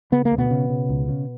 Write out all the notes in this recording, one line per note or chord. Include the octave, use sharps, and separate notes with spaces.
C#3 B3
A#3
D2
B2 B3
C#3
C#3
C#2
C#3